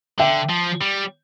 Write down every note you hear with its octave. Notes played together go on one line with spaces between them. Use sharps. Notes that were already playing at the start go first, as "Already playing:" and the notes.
D3 E5 G5
F3
G3